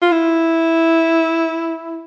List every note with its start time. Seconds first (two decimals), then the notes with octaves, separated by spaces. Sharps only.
0.02 F4
0.12 E4